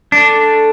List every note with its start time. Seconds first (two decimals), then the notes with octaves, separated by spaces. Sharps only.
0.12 A3 D4